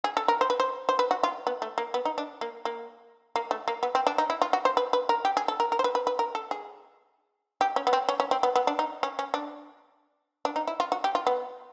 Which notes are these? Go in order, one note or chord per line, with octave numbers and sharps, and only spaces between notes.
G#4
A4
A#4
C5
B4
C5
C5
B4
F#4
F4
B3
A3
A#3
B3
D#4
D4
A#3
A#3
A#3
A3
A#3
B3
C4
D4
D#4
E4
F4
F#4
C5
B4
B4
A#4
G4
G#4
A4
A#4
A#4
C5
B4
B4
B4
A#4
A4
G#4
G4
C#4
B3
C4
C#4
C#4
C4
B3
B3
D4
D#4
C#4
C#4
D4
D4
D#4
E4
F4
F#4
G4
F4
B3